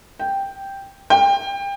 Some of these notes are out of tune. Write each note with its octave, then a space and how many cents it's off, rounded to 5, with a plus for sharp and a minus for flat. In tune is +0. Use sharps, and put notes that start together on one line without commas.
G5 +0
G5 +25